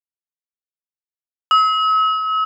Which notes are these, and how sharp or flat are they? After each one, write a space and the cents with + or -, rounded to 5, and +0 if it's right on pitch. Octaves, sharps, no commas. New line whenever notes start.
E6 -45